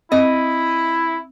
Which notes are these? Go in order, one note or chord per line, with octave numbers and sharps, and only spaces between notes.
C4 E4 D#5